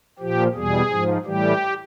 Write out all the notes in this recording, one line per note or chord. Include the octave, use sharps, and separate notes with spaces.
A#2 F3 G4
E2 B2 G3 G#4
G#2 F3
A2 E3 G3 G4